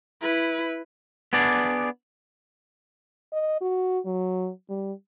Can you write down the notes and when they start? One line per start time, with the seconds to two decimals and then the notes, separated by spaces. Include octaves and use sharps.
0.22 E4 B4
1.33 B3 D4 G#4 D5
3.32 D#5
3.61 F#4
4.05 F#3
4.69 G3